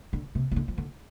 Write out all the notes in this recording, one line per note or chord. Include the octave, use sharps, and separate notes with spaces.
D3
C3
C3
D3
F3
D3